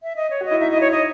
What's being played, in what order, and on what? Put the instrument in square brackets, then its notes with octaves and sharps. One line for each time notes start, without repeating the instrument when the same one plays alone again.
[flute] E5
D#5
C#5
[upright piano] F#4
[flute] D#5
[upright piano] E4
[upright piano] D#4 [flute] E5
[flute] D#5
[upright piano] E4
[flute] C#5
[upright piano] D#4 [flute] D#5